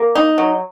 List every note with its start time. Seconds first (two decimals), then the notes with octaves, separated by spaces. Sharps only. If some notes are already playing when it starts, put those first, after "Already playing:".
Already playing: A#3
0.15 D#4
0.38 F#3